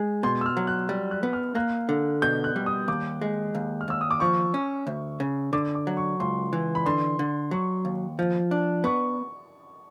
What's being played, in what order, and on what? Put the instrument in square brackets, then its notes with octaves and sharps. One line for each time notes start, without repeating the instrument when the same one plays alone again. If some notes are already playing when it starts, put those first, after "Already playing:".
Already playing: [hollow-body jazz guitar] G#3
[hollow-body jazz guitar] B2 [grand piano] C6
[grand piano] E6
F6
[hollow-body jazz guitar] F#3
[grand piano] F#6
[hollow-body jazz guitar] G3
[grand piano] F#6
[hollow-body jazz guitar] B3
[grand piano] F6
[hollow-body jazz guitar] A#3 [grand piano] F#6
[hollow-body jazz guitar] D3
[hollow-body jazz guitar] B2 [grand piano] G6
[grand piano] F#6
[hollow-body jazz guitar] G3
[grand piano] D#6
[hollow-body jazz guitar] D#2 [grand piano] D6
[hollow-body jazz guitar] G#3
D#2
[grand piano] F6
[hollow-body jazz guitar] D#2 [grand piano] E6
[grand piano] D#6
D6
[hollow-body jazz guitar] F3 [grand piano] C#6
[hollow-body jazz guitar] C#4
D2
C#3
[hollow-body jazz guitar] D3 [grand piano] D6
[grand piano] D6
[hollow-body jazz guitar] F#3
[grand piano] C#6
[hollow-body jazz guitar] C#2 [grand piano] C6
[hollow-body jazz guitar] E3
[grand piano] B5
[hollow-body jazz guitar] D3 [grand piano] C6
[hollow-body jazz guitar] D3
[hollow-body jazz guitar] F#3 [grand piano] C#6
[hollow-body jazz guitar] D#2
F3
D4
[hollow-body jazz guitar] B3 [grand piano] C#6